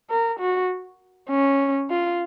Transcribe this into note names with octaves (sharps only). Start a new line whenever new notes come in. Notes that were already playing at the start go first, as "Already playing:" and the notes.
A#4
F#4
C#4
F4